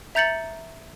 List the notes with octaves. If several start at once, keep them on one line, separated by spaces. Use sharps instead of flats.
E5 A#5 G6 A6 C#7 F#7